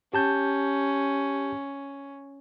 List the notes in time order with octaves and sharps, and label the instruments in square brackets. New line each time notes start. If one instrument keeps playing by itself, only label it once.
[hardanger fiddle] C#4 [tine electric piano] G4 A5 G6